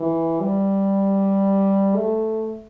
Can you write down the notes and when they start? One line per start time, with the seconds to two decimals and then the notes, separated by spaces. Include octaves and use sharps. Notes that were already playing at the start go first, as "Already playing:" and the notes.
Already playing: E3
0.41 G3
1.95 A3